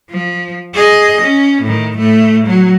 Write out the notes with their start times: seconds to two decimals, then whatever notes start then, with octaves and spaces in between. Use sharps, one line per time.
0.11 F3
0.74 G#4 D#5
1.22 C#4
1.63 A2 D#3
1.97 A2 A3
2.47 F#3